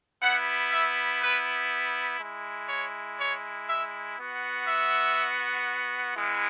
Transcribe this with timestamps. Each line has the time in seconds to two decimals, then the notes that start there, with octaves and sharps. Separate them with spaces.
0.21 B3 E4 F#5
0.71 E5
1.21 B4
2.19 G#3 E4
2.69 C#5
3.18 C#5
3.67 E5
4.17 B3 F#4
4.67 E5
6.15 G#3 B3 E4